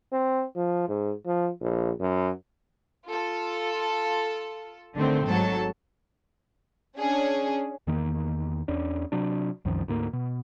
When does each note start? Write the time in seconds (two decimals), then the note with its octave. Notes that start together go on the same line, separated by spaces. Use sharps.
0.12 C4
0.56 F3
0.89 G#2
1.27 F3
1.61 A#1
2.00 F#2
3.07 F4 A4
4.95 D3 D#3 A3 C4
5.27 G#1 G#2 F#3 A4 A5
6.98 C#4 D4 G#4
7.87 E2 D#3 A#3
8.68 E2 C#4 D4
9.12 C3 F#3 D4
9.65 C2 F#2 D#3 F3
9.88 D2 G#2 A#3
10.13 B2